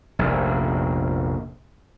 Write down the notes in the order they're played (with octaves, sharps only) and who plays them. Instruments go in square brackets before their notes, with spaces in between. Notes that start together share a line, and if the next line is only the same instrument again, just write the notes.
[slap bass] F1 A#1